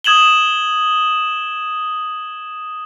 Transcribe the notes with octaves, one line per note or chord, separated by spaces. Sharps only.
D#6 G#6 E7 F#7 G7